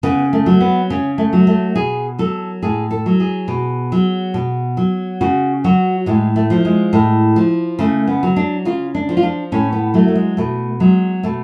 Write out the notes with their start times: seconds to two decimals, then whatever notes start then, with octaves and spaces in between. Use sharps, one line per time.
0.03 C#3 B3
0.33 A3
0.46 F#3
0.61 B3
0.90 C#3 C#4
1.18 A3
1.33 F#3
1.47 A3
1.75 B2 G#4
2.19 F#3 A4
2.63 A2 G#4
2.91 A4
3.06 F#3
3.20 G#4
3.48 B2
3.92 F#3
4.34 B2
4.77 F#3
5.21 C#3 F#4
5.64 F#3 F#4
6.06 A2 G#3
6.36 A3
6.50 F3
6.65 G#3
6.93 A2
7.36 F3
7.79 C#3 A3
8.07 B3
8.23 F#3
8.36 D4
8.65 C#3 F4
8.95 D4
9.09 F3
9.17 F4
9.23 D4
9.52 A2 C#4
9.72 B3
9.94 F#3 A3
10.08 A3
10.16 G#3
10.37 B2 A3
10.80 F#3 G#3
11.23 B2 A3